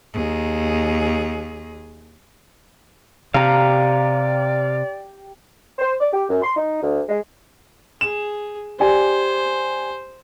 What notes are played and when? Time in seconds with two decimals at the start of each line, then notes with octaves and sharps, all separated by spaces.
0.13 D#2 G#4
3.34 C3 G4 D5 F5 A#5
5.79 C5
6.01 D5
6.13 G4
6.30 F#2
6.43 C6
6.57 D#4
6.83 D2
7.09 G#3
8.01 G#4 E7
8.80 G4 C5 D5 G#5